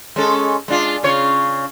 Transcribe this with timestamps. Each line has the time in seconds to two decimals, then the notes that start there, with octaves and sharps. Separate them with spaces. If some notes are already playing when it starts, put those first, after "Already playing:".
0.16 G#3 C#4 A4
0.68 G#3 D4 F4
1.03 C#3 F4 C#5